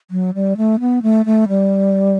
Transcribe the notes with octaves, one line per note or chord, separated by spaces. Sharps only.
F#3
G3
A3
B3
A3
A3
G3